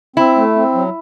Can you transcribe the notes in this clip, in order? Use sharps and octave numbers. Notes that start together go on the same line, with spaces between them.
C4 E4
A3
C4
F#3